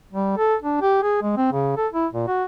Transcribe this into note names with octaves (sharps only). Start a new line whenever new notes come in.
G3
A4
D4
G4
G#4
G#3
C4
C#3
A4
E4
A#2
F#4